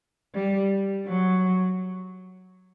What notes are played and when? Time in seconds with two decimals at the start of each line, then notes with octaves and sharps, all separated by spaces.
0.34 G3
1.06 F#3